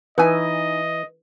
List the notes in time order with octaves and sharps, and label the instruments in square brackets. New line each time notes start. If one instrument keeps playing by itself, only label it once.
[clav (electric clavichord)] E3 [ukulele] D#4 G#5 [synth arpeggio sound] B4 [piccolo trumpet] D#5